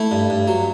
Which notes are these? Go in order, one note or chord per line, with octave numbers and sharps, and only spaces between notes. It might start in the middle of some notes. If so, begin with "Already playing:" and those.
Already playing: A3 E4
G2
G2
F#3